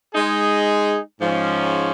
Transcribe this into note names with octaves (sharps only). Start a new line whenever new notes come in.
G#3 D#4 G#4
G#2 F3 C#4